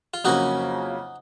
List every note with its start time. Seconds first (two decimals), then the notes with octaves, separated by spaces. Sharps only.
0.14 F4
0.24 F2 C#3 F#3 A#3 C#4 D#4 F#4